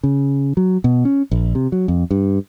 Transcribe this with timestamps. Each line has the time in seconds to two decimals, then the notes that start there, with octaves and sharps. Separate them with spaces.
0.04 C#3
0.57 F#3
0.84 B2
1.05 C#4
1.31 A#1
1.55 C3
1.72 F#3
1.88 F2
2.11 G2